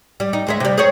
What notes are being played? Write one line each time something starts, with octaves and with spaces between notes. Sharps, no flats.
G3
D#4
D2 G#3 E5
C3 G3
G#4 C5 C#5